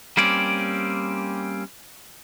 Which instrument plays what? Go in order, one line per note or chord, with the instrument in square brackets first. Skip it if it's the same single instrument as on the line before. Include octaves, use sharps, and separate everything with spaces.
[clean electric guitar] G3 A#3 C4 C#4 D5